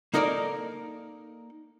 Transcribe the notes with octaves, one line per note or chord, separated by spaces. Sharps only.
A#3 D#4 A4 A#4 D5